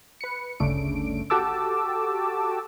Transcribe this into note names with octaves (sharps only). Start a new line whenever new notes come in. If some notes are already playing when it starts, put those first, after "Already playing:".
B4 C#7
G1 D2 C#3 A3 D4 D7
F#4 G4 A4 A5 D6 E6